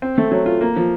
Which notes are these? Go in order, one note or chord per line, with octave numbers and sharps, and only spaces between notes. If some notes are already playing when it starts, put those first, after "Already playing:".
C4
A3
F#3
F4
A#3
F3